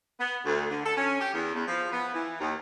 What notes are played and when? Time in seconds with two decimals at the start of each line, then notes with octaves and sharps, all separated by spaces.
0.20 B3
0.44 D2
0.70 D3
0.84 A4
0.97 C#4
1.20 G4
1.34 E2
1.55 E2
1.67 F3
1.92 B3
2.14 E3
2.40 D#2